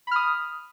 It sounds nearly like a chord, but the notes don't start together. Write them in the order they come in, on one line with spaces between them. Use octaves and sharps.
B5 F6 D#6